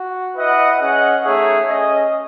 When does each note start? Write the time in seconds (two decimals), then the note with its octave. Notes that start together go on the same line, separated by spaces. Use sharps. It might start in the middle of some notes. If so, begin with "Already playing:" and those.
Already playing: F#4
0.34 E4 B4 D#5 F#5
0.78 C#4 G#4 D#5 F#5
1.23 A3 D#4 G#4 C#5 E5
1.67 C#4 G#4 D#5